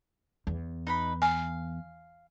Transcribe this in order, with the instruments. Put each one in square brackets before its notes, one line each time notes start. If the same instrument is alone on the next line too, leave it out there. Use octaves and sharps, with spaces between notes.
[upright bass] E2
[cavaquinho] D#4 B4 B5
[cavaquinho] F5 [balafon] G#5